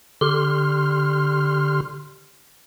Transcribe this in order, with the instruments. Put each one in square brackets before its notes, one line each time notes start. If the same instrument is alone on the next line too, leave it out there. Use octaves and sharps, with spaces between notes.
[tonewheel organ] D3 G4 C6 F6